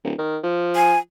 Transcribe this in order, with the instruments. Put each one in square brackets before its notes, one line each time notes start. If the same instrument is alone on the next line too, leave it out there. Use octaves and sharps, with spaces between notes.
[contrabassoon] D1
D#3
F3
[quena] G#5